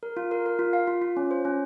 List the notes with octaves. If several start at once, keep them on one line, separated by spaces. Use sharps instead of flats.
A#4
F4
A#4
A#4
F4
F5
F4
F4
C#4
C5
C#4